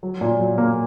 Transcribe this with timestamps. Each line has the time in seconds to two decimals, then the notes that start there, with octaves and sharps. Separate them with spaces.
0.03 F#3
0.21 A#2
0.40 F#3
0.58 A#3